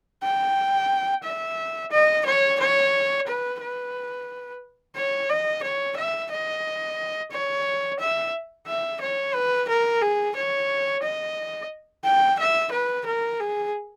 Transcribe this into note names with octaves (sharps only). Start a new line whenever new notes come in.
G5
E5
D#5
C#5
C#5
B4
B4
C#5
D#5
C#5
E5
D#5
C#5
E5
E5
C#5
B4
A#4
G#4
C#5
D#5
G5
E5
B4
A#4
G#4